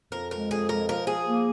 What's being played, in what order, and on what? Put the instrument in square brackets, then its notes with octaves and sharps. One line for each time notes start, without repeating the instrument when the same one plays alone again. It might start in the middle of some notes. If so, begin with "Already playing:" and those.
[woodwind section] F2 [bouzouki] A#4
[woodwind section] G#3 [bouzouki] A#4
[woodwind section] F2 [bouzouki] G#4
[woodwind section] G#3 [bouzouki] A#4
[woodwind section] F3 [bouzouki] A#4
[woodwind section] F3 [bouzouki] G#4
[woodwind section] A#3